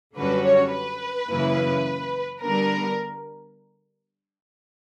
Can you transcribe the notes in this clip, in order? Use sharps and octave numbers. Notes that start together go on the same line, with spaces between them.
F#2 D3 G3 C#4 F#4 B4
C#5
B4
F#2 C#3 E3 A#3 E4
D3 G3 B3 D4 A#4